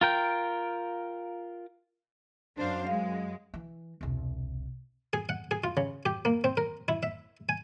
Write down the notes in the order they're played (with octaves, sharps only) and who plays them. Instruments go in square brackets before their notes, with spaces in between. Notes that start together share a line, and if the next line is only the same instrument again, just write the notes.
[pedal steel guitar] F4 A#4 G5
[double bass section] F#2 [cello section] D4 C5 F5
[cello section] G#3 [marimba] F5
[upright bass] E3
E1 C2
[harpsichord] G#4
F#5
G#4
F4
C#3
G4
A#3
C4
A#4
E4
E5
G#5